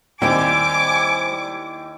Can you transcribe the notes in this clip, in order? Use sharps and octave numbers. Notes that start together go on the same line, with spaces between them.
D#2 G3 C4 E4 G4 G5 G#5 D6